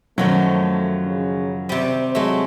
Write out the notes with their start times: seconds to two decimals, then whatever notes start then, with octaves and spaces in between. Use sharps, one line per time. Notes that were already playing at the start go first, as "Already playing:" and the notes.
0.18 F#2 D#3 F3 F#3 A3
1.06 C#3
1.69 C3 G3 C5
2.15 F#3 G#3 A3